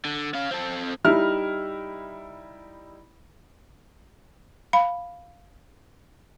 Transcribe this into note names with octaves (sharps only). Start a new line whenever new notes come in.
D3
C#4 F5
C4 A4
G3 D#4 E4 F6
F5 B5